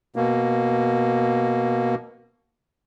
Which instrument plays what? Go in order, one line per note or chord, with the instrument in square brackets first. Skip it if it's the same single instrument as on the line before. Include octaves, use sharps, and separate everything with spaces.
[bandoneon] B2 A#3